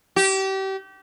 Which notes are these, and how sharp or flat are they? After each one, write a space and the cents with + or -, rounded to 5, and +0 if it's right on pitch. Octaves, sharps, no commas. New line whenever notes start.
G4 -30